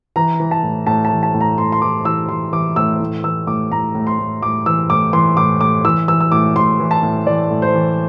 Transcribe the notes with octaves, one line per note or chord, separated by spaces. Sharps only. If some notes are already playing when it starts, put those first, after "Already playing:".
E3 A#5
E3
A5
A2
A2 A5
A5
E3
A5
A2
A#5
A2 C6
C6
E3 D6
E3 E6
E3 C6
E3 D6
A2 E6
A2
E3 E6
A2 D6
A2 A#5
A2
C6
A2
A2 D6
E3 E6
A2 D6
E3 C6
A2 D6
A2 D6
E3 E6
E3 E6
E6
A2 D6
A2 C6
E3
A5
A2
E3 D5
A2
C5
E3